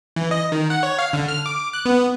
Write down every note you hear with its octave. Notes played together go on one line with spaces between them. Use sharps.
E3
D#5
D#3
F#5
C#5
F5
D3
F6
D6
F#6
B3